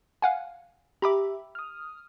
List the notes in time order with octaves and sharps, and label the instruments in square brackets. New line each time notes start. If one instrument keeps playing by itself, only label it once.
[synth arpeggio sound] F5 F#5 G#5
[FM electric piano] G4 E5 [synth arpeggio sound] A#5 B5 D6
[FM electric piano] D#6 F6